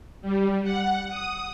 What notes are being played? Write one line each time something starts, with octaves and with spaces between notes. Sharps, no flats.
G3
F#5
D#6